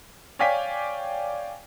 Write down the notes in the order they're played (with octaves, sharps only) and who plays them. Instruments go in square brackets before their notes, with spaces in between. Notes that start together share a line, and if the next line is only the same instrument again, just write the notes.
[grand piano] C#5 D5 F5 G5 G#5 B6